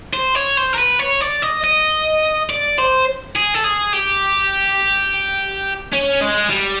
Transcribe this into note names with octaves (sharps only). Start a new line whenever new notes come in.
C5
C#5
C5
A#4
B4
C#5
D5
D#5
D#5
D5
C5
G#4
A4
G#4
G4
C#4
G#3
G3